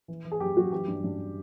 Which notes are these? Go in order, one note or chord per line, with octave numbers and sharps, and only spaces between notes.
E3
E3
G#4
F#2 G4
F#2 F#4
E3 G4
G2
G2